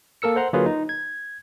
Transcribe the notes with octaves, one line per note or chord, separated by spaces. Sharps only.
A#3 A4 A#4 E6 C#7
C5 F#5 A#5 C6
D3 F#3 A#3 F4 G#4 B4
D#4
G#6